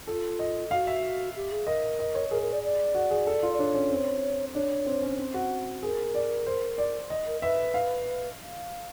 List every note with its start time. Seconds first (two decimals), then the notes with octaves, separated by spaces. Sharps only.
0.07 F4 A4
0.39 D#5
0.71 F#4 F5
0.87 E5
1.35 G4
1.51 G#4
1.67 A#4 D#5
1.99 D#5
2.15 C#5
2.31 G#4 A#4
2.42 A#4
2.52 D5
2.63 D5
2.95 F#4
3.11 G#4
3.27 A4
3.43 F4
3.53 D5
3.59 D4 C#5
3.74 C#4
3.91 C4
4.55 D4 C#5
4.86 C4
5.03 C#4
5.19 C4
5.34 F#4
5.82 G#4 A#4
6.15 D5
6.46 C5
6.78 D5
7.10 D#5
7.26 A#4
7.42 B4 E5
7.74 F5